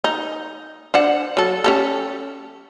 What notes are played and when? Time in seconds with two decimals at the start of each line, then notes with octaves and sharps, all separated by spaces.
0.04 D#4
0.94 D4 C5 F#5
1.37 F#3 A4
1.64 C#4 G4 A4